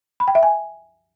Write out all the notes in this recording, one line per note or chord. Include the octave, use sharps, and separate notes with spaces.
B5
G5
E5
G#5